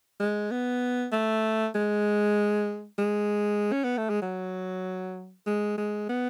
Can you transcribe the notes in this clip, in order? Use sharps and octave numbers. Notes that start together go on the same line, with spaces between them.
G#3
B3
A3
G#3
G#3
C#4
B3
A3
G#3
F#3
G#3
G#3
B3